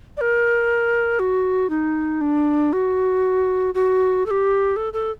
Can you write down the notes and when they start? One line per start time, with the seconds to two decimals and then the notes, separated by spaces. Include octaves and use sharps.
0.17 D5
0.21 A#4
1.19 F#4
1.70 D#4
2.21 D4
2.73 F#4
3.74 F#4
4.26 A4
4.31 G4
4.76 A4
4.93 A4